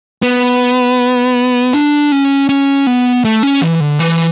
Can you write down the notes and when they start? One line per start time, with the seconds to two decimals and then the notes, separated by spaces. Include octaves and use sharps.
0.22 B3
1.74 D4
2.12 C#4
2.49 C#4
2.87 B3
3.25 A3
3.43 C#4
3.61 E3
3.80 D3
3.99 E3